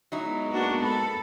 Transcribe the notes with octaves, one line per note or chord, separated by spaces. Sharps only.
F#3 G#3 B3 D#4 E4
A#3 D4 F#4
A4 B5